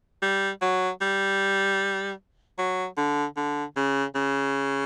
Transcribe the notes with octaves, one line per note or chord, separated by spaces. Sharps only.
G3
F#3
G3
F#3
D3
D3
C#3
C#3